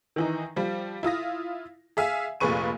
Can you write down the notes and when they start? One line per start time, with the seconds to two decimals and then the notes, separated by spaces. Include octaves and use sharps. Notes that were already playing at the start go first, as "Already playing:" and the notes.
0.16 D#3 E3 D#4
0.56 F3 G3
1.03 E4 F4 D#6 A#6
1.97 G#4 E5 F5 G#5
2.40 F1 A#2 G#4 B4 C#6 D#7